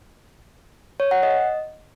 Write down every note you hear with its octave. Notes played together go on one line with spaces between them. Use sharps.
C#5
F#5
D#5